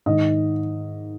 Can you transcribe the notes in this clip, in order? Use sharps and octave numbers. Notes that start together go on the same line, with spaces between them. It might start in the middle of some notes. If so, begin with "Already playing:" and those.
G#2 D#3 D#5